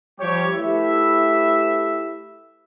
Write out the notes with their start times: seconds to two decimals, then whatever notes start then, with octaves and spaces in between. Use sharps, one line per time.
0.20 F3 G3 G4 C#5
0.54 A3 E4 G4 B4 E5